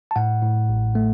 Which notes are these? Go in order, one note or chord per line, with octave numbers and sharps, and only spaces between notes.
A5
A2 F#5
A2
A1
A3